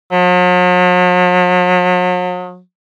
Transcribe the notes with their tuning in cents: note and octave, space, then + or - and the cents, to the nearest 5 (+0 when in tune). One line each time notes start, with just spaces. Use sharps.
F#3 -45